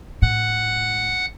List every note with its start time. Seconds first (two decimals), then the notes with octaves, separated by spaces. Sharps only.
0.22 A2 F#5 F#6